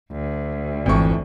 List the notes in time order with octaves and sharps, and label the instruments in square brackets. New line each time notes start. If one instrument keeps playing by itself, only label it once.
[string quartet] D2
[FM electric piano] G#1 G#2 [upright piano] F2 C#6 [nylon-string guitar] E3 F3